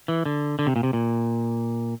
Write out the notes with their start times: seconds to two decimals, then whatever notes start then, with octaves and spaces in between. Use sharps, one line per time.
0.08 E3
0.26 D3
0.59 D3
0.67 C3
0.76 A#2
0.83 C3
0.93 A#2